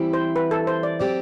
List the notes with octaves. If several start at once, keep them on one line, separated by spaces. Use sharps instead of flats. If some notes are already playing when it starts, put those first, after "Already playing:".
Already playing: E3 G3 C4 E4 G4
C5
B4
A4
C5
D5
F#3 C4 G4 D5